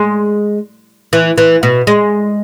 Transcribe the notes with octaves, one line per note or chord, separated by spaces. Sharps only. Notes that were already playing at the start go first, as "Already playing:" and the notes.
Already playing: G#3
E3
E3
B2
G#3